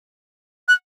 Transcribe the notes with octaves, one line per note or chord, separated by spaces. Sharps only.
F#6